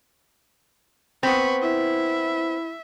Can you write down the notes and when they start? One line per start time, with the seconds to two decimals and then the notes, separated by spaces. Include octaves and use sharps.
1.23 B3 C4 B5 C#6
1.62 E4 E5